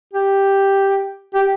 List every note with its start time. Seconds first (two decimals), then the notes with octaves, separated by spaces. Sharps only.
0.14 G4
1.34 G4